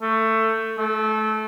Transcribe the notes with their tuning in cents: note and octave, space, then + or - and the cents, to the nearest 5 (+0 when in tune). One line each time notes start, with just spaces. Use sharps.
A3 +15
A3 -20